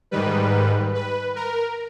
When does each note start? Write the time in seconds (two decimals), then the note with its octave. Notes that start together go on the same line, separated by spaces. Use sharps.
0.11 G#2 D#3 G3 B4
0.94 B4
1.36 A#4